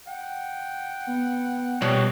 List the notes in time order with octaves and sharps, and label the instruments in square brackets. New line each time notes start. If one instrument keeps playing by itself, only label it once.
[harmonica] F#5 G5
[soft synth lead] B3
[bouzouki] B2 [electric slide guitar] G3 G4 C#5 [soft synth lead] F#6